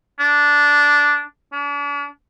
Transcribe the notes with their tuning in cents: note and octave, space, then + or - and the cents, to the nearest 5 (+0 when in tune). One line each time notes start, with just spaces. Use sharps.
D4 -10
D4 -45